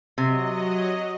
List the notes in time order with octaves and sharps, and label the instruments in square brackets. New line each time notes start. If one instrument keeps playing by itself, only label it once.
[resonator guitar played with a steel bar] C3 [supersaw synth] F#3 D#5